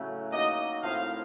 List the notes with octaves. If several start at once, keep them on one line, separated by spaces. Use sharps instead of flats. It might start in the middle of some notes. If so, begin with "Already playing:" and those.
Already playing: A2 C#3 F#3 A3 C#4
A#3 D#4 F#4 D#5
A2 F3 C4 F5